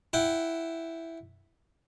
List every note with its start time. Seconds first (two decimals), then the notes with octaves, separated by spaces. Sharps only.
0.13 E4 F#5 G5